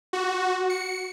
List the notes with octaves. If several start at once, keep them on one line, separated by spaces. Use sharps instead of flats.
F#4
C#7